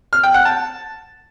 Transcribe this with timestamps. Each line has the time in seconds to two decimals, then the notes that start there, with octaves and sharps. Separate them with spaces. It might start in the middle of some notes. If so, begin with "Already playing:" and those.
0.13 F6
0.24 G5
0.34 F#5
0.45 A5